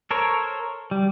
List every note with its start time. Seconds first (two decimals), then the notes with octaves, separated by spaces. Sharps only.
0.11 A4 A#4 C5 C#5
0.91 G3